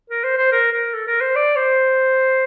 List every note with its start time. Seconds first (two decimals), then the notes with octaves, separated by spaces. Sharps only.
0.10 A#4
0.24 C5
0.38 C5
0.52 A#4
0.72 A#4
0.94 A4
1.07 A#4
1.21 C5
1.36 D5
1.56 C5